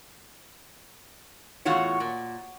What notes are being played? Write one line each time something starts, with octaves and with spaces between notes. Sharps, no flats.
E2 A2 F4 F#4 C#5
A#2